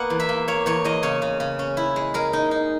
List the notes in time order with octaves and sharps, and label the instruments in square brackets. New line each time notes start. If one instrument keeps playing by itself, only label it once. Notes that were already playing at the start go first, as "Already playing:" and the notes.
Already playing: [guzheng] A#3 B3 F#5
E2
E5
A#3
A#3 C#5
E2 C#5
E2 D#5
C#3 C#5
C#3
C#3
C#4
E4
G#3
G#3 A#4
D#4
D#4